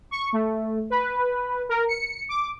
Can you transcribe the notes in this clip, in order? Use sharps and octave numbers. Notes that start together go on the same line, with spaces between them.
C#6
A3
B4
A#4
C#7
D6